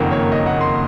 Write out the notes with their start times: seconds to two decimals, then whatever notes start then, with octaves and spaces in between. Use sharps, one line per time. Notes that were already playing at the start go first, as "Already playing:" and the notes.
Already playing: F#1 F2 D#3 A#3 F#5
0.11 C#5
0.32 D#5
0.46 F#5
0.61 C6